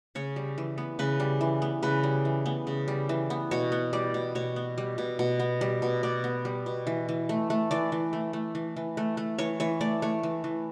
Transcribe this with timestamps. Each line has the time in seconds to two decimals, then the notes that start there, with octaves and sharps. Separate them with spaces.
0.15 C#3 C#5
0.36 G3
0.58 E3
0.78 B3
0.99 C#3 B4
1.20 G3
1.41 E3
1.62 B3
1.83 C#3 B4
2.04 G3
2.25 E3
2.46 B3
2.67 C#3
2.88 G3
3.09 E3
3.30 B3
3.51 B2 C#5
3.72 B3
3.93 G3 D5
4.14 B2
4.35 B2 C#5
4.56 B3
4.78 G3
4.98 B2
5.19 B2
5.40 B3
5.61 G3
5.82 B2
6.03 B2 D5
6.24 B3
6.45 G3
6.66 B2
6.87 E3
7.09 E3
7.29 A3
7.50 A3
7.71 E3 D5
7.92 E3
8.13 A3
8.33 A3
8.55 E3
8.76 E3
8.97 A3
9.17 A3
9.38 E3 C#5
9.60 E3 C#5
9.81 A3 D5
10.02 A3 C#5
10.23 E3
10.44 E3